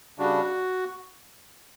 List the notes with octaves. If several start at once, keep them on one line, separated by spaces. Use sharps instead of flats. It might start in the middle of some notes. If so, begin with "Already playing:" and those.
C#3 G3 D4 F#4